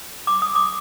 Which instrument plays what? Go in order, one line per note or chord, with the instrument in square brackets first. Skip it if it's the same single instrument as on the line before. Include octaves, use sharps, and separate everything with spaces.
[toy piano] D6
D#6
D6